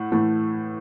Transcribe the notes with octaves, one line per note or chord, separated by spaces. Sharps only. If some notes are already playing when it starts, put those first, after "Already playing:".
Already playing: A2 A3 F#5
A2 E3 A3